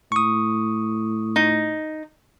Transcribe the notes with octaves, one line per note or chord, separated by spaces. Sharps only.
A2 C#6 D#6
D#4